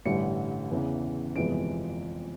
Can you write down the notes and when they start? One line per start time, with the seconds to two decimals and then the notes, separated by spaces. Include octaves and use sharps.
0.05 A1 G2 D3 G3 C#7
0.71 E2 C#3 E3
1.35 G1 F2 C3 E3 G#3 D7